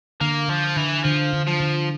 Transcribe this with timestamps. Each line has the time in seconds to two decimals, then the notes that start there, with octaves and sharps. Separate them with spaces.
0.21 D3 A#3
0.48 D3 F3
0.77 D3 E3
1.04 D3 F3
1.33 D3
1.47 F3
1.60 D3